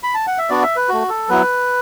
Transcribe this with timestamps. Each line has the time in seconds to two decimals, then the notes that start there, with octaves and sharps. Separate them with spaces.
0.03 B5
0.14 A5
0.27 F#5
0.38 E5
0.49 B3 D4 F#4 D5
0.63 E5
0.76 B4
0.89 A3 F#4
1.09 A4
1.29 F#3 B3 E4 B4